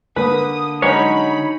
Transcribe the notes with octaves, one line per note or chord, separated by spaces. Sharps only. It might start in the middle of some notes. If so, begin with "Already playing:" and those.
D3 A#3 B4 D#6
F#3 G#3 C#4 D#4 C#5 B5